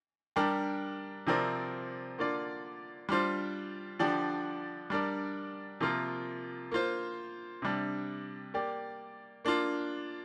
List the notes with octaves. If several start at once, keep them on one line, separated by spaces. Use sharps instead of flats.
G3 D4 G4 A#4
C3 F3 C4 A#4 D5
D3 A#3 F4 D5
G3 D4 F4 C5
D3 F3 D4 G4 D5
G3 D4 A#4 D5
C3 F3 A#3 F4 A#4
A#3 F4 C5
C3 G3 D4
A#3 G4 D5
A#3 D4 F4